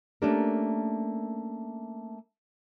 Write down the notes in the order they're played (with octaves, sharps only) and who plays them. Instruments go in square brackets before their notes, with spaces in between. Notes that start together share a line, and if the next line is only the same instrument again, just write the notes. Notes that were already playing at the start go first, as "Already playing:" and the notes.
[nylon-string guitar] A3 A#3 C#4 D4 G4 A#4